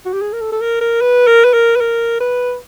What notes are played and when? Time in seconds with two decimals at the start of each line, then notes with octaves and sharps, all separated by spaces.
0.06 F#4
0.13 G4
0.22 G#4
0.33 A#4
0.41 A4
0.52 A4
0.61 A#4
0.81 A#4
1.01 B4
1.27 A#4
1.45 B4
1.54 A#4
1.76 B4
1.81 A#4
2.21 B4